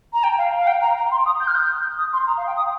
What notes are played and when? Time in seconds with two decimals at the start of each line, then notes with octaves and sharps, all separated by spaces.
0.13 A#5
0.23 G5
0.37 F5
0.58 F5
0.67 G5
0.81 A#5
0.96 A#5
1.11 C6
1.25 D#6
1.40 G6
1.47 F6
1.54 G6
1.97 D#6
2.12 C6
2.26 A#5
2.37 F5
2.46 G5
2.56 D#6